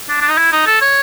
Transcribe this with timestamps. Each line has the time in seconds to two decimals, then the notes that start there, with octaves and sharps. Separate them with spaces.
0.09 D4
0.21 D4
0.29 D#4
0.37 E4
0.52 D#4
0.66 A4
0.81 C#5